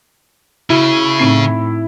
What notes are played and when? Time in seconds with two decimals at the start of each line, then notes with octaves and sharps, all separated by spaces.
0.70 C#3 E4 F#4
1.20 A2 C4 D#4